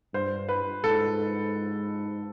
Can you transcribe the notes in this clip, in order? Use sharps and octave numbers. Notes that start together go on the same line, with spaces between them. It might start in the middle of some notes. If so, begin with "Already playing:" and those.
G2 C5
B4
G#2 A4